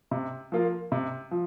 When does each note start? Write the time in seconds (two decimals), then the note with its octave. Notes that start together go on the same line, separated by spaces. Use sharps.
0.11 C3
0.52 F3 A#3 F4 A#4
0.92 C3
1.31 F3